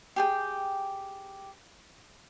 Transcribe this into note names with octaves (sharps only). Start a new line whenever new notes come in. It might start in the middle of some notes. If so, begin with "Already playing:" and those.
G4 G#4 G5